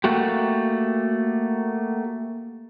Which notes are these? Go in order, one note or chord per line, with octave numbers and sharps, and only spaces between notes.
A3 A#3 F#4 G4